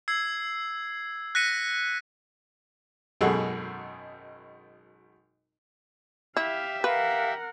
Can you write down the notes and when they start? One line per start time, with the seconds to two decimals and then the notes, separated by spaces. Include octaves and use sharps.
0.08 E6 G#6 C7
1.35 F#6 A#6 B6 C#7 D#7
3.21 G#1 F#2 B2 G#4 A4 F#5
6.37 E4 G4 E5 F5
6.84 A#4 B4 F5 F#5